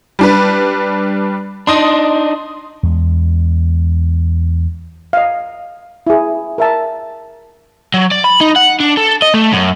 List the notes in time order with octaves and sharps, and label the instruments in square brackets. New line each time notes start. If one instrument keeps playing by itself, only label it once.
[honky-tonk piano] G3 D4 B4
[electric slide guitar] D4 D#4 [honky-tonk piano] C6 D#6
[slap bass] E2 G#3
[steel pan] D#5 F5
E4 G#4
A#4 E5 A5
[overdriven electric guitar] F#3
D5
B5
D#4
F#5
D4
A4
D#5
A3
F#2